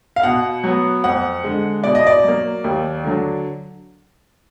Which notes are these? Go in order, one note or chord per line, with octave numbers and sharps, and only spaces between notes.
F5
B2 F#5
F#3 B3
F2 F#5
D3 G#3
B2 D5
D#5
D5
F#3 A#3
D#2
D3 F#3